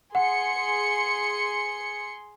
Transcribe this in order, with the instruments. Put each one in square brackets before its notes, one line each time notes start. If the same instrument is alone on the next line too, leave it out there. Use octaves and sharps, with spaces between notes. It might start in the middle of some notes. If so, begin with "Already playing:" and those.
[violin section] G#4 C6 C#7 [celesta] F#5